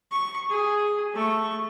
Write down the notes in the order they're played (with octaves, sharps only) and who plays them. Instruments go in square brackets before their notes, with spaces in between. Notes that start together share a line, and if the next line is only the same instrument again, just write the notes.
[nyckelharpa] C#6
G#4
A3 C#6